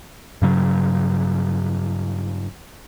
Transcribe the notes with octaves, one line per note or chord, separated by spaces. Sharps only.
G2 C#3 F#3